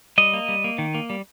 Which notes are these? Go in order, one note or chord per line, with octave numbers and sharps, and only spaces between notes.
G3 D#5
A#3
G3
A#3
D#3
A#3
G3